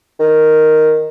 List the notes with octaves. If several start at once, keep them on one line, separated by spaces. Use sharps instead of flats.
D#3